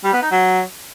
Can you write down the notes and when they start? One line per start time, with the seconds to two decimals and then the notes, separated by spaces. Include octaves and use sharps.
0.04 G3
0.13 B3
0.22 D#4
0.31 F#3